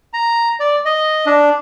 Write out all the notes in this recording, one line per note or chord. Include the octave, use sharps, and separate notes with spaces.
A#5
D5
D#5
D4